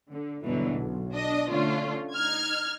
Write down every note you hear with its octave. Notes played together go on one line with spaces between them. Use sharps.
D3
G1 E2 B2 D3 E3 F#3
B1
D4 D#5
D3 A3 C#4 D4 F4
D#4 F6 G#6